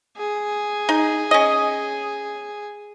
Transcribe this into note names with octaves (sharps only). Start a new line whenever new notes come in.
G#4
D#4
C#4 D#5